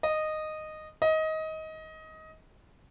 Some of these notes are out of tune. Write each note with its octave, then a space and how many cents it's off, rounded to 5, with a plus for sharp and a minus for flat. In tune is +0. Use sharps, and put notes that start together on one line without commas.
D#5 -10
D#5 +20